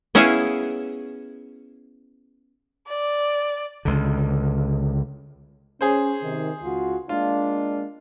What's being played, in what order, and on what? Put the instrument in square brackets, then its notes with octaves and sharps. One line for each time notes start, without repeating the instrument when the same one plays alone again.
[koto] B3 C#4 E4 G#4 E5 F5
[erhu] D5
[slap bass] C#2 D3
[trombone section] C#4 [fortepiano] G#4 C5
[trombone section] C3 D#3
C#2 F4 F#4
[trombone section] G#3 A#3 D4 [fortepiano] F4